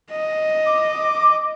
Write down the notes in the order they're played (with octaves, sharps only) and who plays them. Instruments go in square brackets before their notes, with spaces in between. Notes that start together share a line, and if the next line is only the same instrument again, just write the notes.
[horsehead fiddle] D#5
[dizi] D6